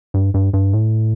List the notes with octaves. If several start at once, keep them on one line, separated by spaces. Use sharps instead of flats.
G2
G2
G2
A2